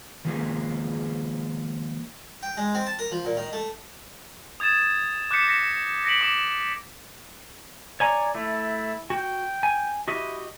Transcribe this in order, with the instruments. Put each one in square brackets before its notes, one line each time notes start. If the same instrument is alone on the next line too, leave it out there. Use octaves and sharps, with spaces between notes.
[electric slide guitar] D#3 F3 G#3 A#3 G#4
[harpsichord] G5
G#3
C4
A5
A#4
F3
A#2
D#3
A3
[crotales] D#6 G#6 A6 E7
D6 F#6 G6 A6 B6 C#7
A#6 B6 C#7
A#6 B6 C#7 D7 F#7
D6
[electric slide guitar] C#5 G#5 A#5 [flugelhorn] D5
[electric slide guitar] A3 [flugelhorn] E4
[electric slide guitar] F#4 [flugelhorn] G5
[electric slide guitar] G#5
[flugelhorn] E4 [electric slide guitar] F#4 G4 D#5